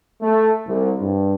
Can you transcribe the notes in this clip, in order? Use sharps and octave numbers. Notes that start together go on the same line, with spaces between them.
A3
C2
G2